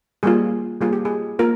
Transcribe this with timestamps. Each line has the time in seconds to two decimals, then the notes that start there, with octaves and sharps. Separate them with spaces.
0.23 G3 A#3 F4 G#4
0.81 G3 A#3 F4 G#4
0.93 G4
1.05 G#4
1.39 A#3 F4 A#4